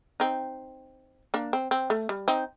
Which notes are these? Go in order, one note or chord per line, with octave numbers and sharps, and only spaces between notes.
C4 D#4
A#3 D4
C4
C4
A3
G3
C4 D#4